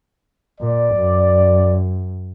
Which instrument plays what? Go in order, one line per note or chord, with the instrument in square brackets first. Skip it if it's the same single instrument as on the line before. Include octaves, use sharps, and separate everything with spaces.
[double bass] A#2 [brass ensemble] D5
[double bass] F#2